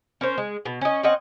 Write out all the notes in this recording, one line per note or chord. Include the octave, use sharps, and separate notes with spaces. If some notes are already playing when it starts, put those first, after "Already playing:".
C#4 A#4 C5
G#3
B2
C#4 D#5
C4 C#4 D#5 F#5